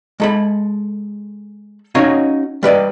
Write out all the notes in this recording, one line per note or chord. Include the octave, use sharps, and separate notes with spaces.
G#3 A4 B5
C#4 D#4 F#4 C#5 D#5 F5
G3 B4 D5 D#5